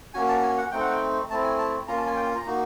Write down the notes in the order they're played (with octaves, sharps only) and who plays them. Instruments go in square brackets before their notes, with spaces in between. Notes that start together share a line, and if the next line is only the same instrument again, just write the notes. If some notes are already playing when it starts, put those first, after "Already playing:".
[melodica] A#3 C#4 F#4 G#5
A5
G#5
F#5
A3 C4 D#4 G5
F#5
G5
A3 C4 E4 A5
G#5
A5
A#3 C#4 F4 A#5
A5
G#5
G5
A#5
A#3 D#4 F#4